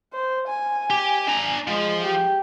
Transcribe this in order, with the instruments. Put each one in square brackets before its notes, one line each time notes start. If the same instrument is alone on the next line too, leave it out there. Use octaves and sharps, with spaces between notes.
[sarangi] C5
G#5
[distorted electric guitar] G4
D4 A#5
[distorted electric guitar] F3 [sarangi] G#3
[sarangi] G4